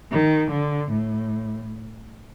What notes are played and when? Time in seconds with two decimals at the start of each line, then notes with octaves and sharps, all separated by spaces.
0.11 D#3
0.51 D3
0.91 A2